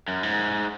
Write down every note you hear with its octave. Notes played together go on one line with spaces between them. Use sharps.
F#2
G#2